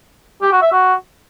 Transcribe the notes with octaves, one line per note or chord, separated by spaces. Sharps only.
G4
F#4
E5
F#4